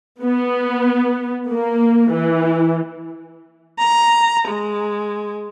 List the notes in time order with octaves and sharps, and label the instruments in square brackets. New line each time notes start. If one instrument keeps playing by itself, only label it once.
[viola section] B3
A#3
E3
[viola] A#5
G#3